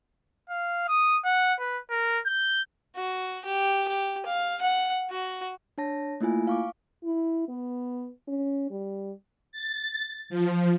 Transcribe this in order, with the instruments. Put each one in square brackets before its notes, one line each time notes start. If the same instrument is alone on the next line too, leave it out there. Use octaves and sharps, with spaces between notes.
[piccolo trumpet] F5
D#6
F#5
B4
A#4
G6
[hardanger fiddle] F#4
G4
G4
F5
F#5
F#4
[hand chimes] D4 C#5 A5 A#6
A3 A#3 E4 F4 G#5
F5 C#6 D6
[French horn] E4
B3
C#4
G3
[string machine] A6
F3